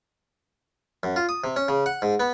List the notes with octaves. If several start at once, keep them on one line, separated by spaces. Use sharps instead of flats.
F#2
F4
D#6
C3
C#4
C#3
F#5
G#2
B3